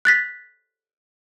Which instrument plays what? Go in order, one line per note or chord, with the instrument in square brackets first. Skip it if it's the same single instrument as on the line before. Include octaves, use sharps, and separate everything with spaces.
[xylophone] F#6 A6 B6